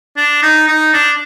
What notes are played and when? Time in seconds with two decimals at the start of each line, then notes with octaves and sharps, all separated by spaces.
0.17 D4
0.43 D#4
0.68 D#4
0.94 D4